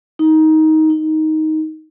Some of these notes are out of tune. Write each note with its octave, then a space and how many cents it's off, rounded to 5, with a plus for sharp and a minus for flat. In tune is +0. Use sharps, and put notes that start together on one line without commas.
D#4 +15
D#4 +10